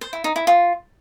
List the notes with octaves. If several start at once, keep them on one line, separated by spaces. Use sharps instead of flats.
C5
E4
D#4
E4
F4